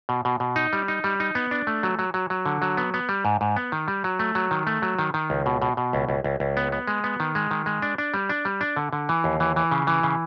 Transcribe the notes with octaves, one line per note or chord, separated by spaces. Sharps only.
B2
B2
B2
D#4
G3
D#4
G3
D#4
B3
D4
A3
F#3
F#3
F#3
F#3
D3
F#3
B3
B3
G3
G#2
G#2
B3
D#3
G3
F#3
A3
F#3
D#3
A3
F#3
D#3
D#3
C#2
B2
B2
B2
C#2
C#2
C#2
C#2
B3
B3
G#3
B3
D#3
G#3
D#3
G#3
D4
D4
G3
D4
G3
D4
D3
D3
E3
D#2
E3
E3
C#3
E3
C#3